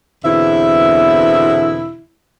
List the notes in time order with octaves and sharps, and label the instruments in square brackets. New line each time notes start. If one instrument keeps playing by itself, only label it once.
[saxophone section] E2 B2 D3 C4 E4 E5